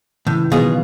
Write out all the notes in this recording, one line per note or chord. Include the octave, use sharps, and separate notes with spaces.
A2 C#3 E3
B2 D#3 F#3 F4 G#4